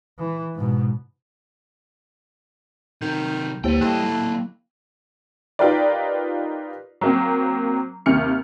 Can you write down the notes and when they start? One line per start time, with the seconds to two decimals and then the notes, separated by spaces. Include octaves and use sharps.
0.19 E3
0.56 G#2 B2
3.01 C3 D#3 F#3 G6
3.64 D2 A#3 G4 B4 C5 G5
3.81 A2 G3 A#3 D#5 G5 E6 F#6
4.03 F#3 A3
5.59 D#4 F4 G4 A#4 B4 D5
7.01 F#3 A#3 C4
8.06 D#2 C3 F6 C#7